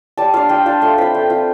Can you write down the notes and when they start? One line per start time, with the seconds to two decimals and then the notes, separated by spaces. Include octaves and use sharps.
0.17 G3 A5
0.34 D4 F4 F5
0.49 G3 G5
0.66 D4 F4 A5
0.81 A3 C6
0.98 C4 F4 B5
1.14 A3 G5
1.30 C4 F4